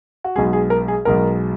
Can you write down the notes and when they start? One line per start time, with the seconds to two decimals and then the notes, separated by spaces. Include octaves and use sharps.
0.24 F#4
0.35 B1 B2 G#3 G#4
0.53 G#4
0.70 A#4
0.88 G#4
1.05 B1 B2 G#3 A#4